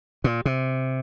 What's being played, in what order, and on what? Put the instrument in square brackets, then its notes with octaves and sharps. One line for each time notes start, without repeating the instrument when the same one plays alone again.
[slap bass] A#2
C3